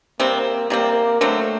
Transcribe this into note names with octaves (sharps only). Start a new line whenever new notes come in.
C3 G3 A#3 C4
C3 G3 A#3 C4
D3 F#3 A3 C4